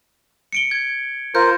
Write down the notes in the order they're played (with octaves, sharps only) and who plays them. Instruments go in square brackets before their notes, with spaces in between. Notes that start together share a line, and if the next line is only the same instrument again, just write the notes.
[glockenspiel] C#7 D7 G7
G#6
[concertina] F4 A#4 C5 [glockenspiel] G6